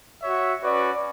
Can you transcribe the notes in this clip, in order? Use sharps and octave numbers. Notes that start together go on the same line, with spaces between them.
F#4 C#5 E5
C#4 F#4 B4 D5